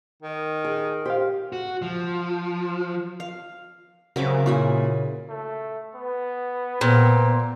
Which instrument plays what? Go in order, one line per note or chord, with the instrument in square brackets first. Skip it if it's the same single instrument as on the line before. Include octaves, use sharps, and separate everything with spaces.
[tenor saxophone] D#3
[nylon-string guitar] G#4
[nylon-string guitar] G4 [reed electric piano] C5 F5
[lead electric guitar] F#4
F3
[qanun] F5
[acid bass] C#3 [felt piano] F#3 C4 C#5 [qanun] A#4 E5 D6
[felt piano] A#2 [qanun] E4 F#4 G#5
[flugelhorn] A3
B3
[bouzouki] A#2 [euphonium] B3 [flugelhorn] C4